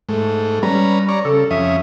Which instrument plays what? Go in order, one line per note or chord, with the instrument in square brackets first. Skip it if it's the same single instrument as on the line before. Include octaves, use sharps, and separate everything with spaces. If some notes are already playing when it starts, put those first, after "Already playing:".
[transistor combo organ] G#2 A3
[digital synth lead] G3 [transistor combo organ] C#4 B4 A#5
[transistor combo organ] C#5 D5 A#5
[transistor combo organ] C#3 [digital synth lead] A4
[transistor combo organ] F2 C#4 D#6 [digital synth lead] E5